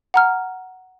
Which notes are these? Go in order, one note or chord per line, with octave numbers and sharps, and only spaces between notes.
F#5 A#5 F6